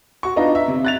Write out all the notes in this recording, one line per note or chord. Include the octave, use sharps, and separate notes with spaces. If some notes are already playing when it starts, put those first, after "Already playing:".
F#4 C#6
B3 D4 D#4 F4 D#5 A#5
E5
C3
F#6 A6 F7